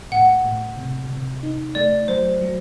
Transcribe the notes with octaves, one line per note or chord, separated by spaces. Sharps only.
A2 F#5
A2
C3
C3
D#4
A3 D5
F#3 C5
F#3